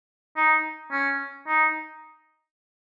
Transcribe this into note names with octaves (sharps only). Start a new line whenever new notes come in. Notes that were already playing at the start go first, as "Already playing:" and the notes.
D#4
C#4
D#4